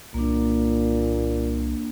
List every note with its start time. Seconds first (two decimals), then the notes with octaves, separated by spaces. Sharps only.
0.14 C2 A#2 A#3 D4